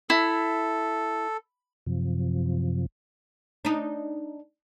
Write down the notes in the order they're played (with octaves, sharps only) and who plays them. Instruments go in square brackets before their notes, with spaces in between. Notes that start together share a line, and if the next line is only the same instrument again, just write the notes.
[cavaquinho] E4 [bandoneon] A4
[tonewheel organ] F#2 C3 F3
[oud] D4 D#4